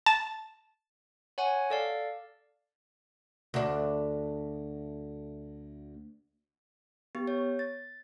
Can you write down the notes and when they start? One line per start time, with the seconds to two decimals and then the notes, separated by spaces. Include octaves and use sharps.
0.06 A5
1.38 C#5 F#5 G#5
1.70 A4 D5 F5
3.54 D2 D4
7.15 B3 G4
7.28 C#5
7.59 A6